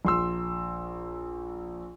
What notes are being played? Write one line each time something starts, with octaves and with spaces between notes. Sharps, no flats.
A#1 C6 E6